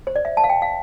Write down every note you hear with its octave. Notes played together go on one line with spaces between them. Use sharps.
C5
D5
E5
A5
F5
G5
F5